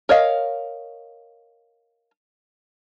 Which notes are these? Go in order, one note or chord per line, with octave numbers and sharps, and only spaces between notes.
A#4 C#5 D#5 F5